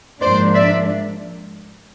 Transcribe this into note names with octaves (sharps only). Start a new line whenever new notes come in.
G#2 F3 A#3 D4 C5 D5
D5 E5